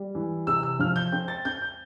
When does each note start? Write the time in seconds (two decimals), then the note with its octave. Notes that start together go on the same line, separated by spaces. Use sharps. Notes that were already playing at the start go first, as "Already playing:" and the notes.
Already playing: G3
0.15 E3
0.47 C3 E6
0.63 E6
0.79 F3 F6
0.96 G6
1.12 C4 G6
1.28 A6
1.45 C4 G6
1.62 G6